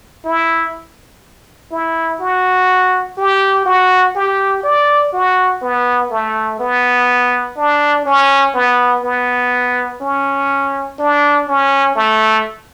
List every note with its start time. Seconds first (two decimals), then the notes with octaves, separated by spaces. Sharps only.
0.25 E4
1.71 E4
2.20 F#4
3.18 G4
3.66 F#4
4.16 G4
4.64 D5
5.13 F#4
5.62 B3
6.11 A3
6.60 B3
7.57 D4
8.06 C#4
8.55 B3
9.04 B3
10.01 C#4
10.99 D4
11.48 C#4
11.96 A3